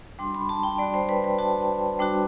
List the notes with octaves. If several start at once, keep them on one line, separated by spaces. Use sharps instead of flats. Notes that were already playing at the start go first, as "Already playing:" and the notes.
G3 D4 F#4 C6
B5
A5
G5
G3 D4 F#4 D5
C5
B4
B4
G3 D4 F#4 A5
G3 D4 F#4